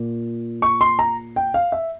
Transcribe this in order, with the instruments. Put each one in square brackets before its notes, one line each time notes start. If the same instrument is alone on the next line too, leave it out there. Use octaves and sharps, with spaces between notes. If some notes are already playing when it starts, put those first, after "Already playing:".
Already playing: [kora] A#2
[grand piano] C#6
C6
A#5
G5
F5
E5